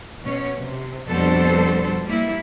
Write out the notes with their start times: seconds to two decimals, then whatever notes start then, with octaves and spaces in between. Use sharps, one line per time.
0.23 B2 C#4 C#5
0.58 C3
1.07 F2 B2 G3 D4 A4 C5
2.06 G3 A#3 E4